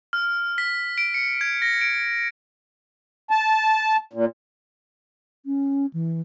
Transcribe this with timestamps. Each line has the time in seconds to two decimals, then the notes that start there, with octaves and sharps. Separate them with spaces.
0.13 F6
0.58 B6
0.98 D7
1.14 C#7
1.41 G#6
1.62 A#6
1.81 D7
3.31 A5
4.13 A#2
5.46 C#4
5.93 E3